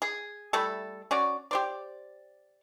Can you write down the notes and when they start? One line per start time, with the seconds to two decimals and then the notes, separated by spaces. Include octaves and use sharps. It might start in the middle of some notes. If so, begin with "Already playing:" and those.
0.02 G#4
0.53 G3 A3 E4 A4
1.11 C#4 F#4 D5
1.51 G4 C5 D5